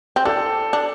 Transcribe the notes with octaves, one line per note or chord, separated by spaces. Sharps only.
C4
D4 A4
D4